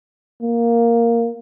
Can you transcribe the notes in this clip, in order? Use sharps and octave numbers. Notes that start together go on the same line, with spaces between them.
A#3